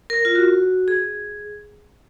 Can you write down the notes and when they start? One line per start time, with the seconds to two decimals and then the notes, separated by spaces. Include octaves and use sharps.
0.10 A#4
0.25 F4
0.35 F#4
0.88 G#4